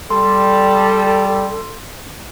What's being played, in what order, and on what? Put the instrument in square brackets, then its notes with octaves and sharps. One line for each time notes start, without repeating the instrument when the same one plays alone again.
[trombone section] G3 [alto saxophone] A4 [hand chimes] C6